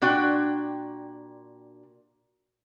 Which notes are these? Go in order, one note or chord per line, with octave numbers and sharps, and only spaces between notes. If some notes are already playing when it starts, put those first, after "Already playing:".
A#2 D4 F#4 G5